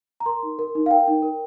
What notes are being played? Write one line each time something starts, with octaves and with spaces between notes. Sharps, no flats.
A#5
A#4 C6
D#4
A#4
D#4
F5
A#4 G5
D#4
A#4